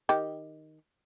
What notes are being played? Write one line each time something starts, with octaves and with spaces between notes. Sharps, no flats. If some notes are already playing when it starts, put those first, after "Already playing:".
D#3 G4